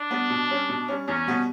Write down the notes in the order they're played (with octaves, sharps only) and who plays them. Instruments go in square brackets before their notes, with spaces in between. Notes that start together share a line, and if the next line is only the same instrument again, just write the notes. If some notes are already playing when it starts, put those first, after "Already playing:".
Already playing: [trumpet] D4
[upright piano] G3 B3
B2
G3 C#4
B2
G3 C#4
[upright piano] E2 [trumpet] C#4
[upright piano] B2 G3 B3